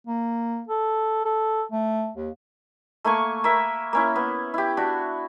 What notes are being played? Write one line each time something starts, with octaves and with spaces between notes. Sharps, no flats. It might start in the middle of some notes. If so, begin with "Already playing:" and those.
A#3
A4
A4
A3
D#2
A3 A#3 G#5 C#6
A#3 E5 B5
A#3 C#4 E4
B3
E4 G4
D4 F#4